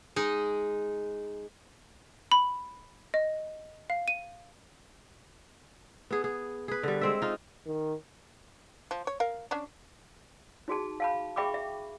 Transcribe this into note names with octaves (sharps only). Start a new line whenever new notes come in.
G#3 D#4
B5
D#5
F5
D#7
B3 G#4
G#4
G#4 B4
D3 G3
G#3 C4 E5
D#4 F4
D#3
F3
C#5
A#4 F5
C#4 D4
D#4 F#4 G#4 A5
F5 A5 B5
G#4 E5 G5 B5 C#6 D6
E5